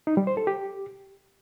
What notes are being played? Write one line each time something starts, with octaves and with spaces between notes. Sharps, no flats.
D#4
G3
C5
A4
G4